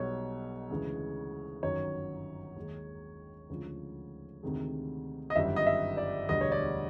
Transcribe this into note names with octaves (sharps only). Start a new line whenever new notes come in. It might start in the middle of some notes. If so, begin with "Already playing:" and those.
Already playing: B1 B2 G3 C#5
D2 C#3 E3 G#3
G1 F#2 D#3 F#3 C#5
D#2 D#3 G#3
D2 C#3 F3 G#3
D2 C3 D#3 G#3
D#5
G1 F#2 D#3 G3 E5
D#5
E5
D5
E1 D2 D3 G3 D#5
C#5
D5